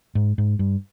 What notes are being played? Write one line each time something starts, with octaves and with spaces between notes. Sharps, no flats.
G#2
G#2
G2